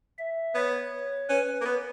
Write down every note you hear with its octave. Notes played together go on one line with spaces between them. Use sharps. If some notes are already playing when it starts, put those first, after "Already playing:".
E5
B3 C#5
C#4 B4
A#3
B3